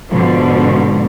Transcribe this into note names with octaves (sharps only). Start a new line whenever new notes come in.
G#2 B2 D3 F3